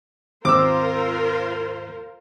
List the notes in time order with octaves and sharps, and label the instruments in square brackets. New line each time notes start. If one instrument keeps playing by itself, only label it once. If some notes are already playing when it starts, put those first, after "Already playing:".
[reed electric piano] D#2 G#2 [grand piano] C4 E6 [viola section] F4 A#4 C5 [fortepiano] D6